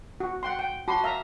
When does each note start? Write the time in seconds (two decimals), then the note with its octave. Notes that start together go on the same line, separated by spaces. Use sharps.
0.20 F#4
0.43 F#5 G5 C6
0.59 G5
0.88 F#4 A5 B5 C6 D6
1.04 E5 F5 A#5